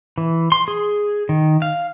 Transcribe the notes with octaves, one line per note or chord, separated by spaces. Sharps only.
E3
C6
G#4
D#3
F5